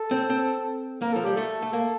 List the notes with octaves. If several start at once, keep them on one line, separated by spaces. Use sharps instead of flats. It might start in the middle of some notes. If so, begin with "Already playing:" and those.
Already playing: A4
C4
C4
A#3 A#4
F3 A4
G3 G4
A3 A4
A3
A#3